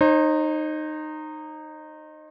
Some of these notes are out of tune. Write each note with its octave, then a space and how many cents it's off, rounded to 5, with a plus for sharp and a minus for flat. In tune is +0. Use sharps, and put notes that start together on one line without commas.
D#4 -15 C5 +40